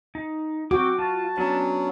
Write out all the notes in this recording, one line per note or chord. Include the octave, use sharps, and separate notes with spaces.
D#4
B3 C4 F#4 G5 D6
F4 A5
F#3 B3 C#4 D4